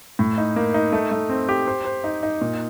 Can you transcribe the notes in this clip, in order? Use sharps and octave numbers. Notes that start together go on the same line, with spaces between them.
A2
D#4
A#3
D#4
A3
A3
C4
G4
C5
C5
D#4
D#4
A#2